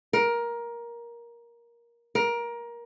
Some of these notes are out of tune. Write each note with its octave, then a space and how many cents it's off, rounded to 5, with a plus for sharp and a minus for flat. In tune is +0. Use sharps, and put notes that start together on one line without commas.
A#4 +15
A#4 +20